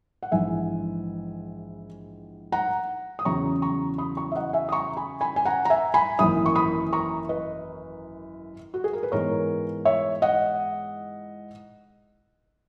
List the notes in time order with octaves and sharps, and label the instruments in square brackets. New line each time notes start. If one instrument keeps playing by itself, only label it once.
[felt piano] F#5
A#1 G#2 E3 E5 G#5
F#5 A#5
D#6
E2 C#3 F#3 C#4 E4 A#5 C#6
A#5 C#6
B5 D#6
A#5 C#6
E5
D#5 F#5
E5 G#5
D#6
A#5 C#6
G#5 B5
G#5 B5
G#5
F#5 A#5
A#5
E5 G#5
G#5 B5
G#1 F#2 E3 A#3 E4 B5 D#6
C#6
B5 D#6
A#5 C#6
B4 D#5
F#4
G#4
A#4
B4
G#2 E3 G#3 B3 D#4 A#4 C#5
C#5 E5
D#5 F#5